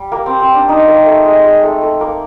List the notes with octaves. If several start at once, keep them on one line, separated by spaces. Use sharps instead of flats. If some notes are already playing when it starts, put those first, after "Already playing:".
Already playing: G3
A#3
C4
C4
D4
D#4
A#3
A3
G#3
G#3
A3
A3
A#3